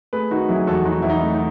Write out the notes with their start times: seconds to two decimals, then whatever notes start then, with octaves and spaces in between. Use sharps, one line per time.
0.13 A3 G#4 B4
0.31 D#3 D#4 F#4
0.49 F#3 E4 G#4
0.67 E2 F#4 A4
0.86 F#3 D#4 F#4
1.02 E2 E4
1.10 D#4
1.22 A3
1.34 D#4